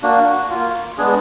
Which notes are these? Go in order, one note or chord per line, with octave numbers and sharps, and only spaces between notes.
A#3 D4 F#4
F#4
A#3 F4
G#3 B3 D4 G#4